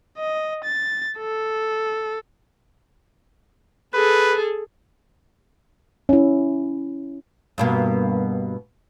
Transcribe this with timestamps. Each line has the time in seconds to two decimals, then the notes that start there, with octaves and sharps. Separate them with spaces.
0.18 D#5
0.65 A6
1.18 A4
3.94 G#4 A4 B4
6.09 C#4 E4
7.58 G2 B2 A#3